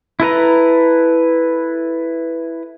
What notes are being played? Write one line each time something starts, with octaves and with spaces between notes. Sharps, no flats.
E4 A4 B4 A#5